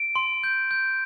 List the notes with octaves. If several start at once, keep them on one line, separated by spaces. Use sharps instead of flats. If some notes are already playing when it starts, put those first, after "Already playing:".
Already playing: D7
C6
G6
G6